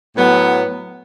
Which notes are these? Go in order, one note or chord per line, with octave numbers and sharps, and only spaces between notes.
A2 F#3 B3